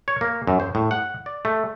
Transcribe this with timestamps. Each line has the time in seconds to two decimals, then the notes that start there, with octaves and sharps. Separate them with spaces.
0.08 C#5
0.21 A#3
0.47 F#2
0.60 C5
0.75 A2
0.91 F#5
1.26 D5
1.45 A3